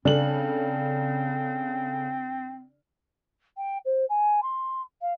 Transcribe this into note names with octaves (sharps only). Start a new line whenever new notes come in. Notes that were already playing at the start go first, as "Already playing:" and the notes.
C#3 C4 D4 A4 F#7
G5
C5
G#5
C6
F5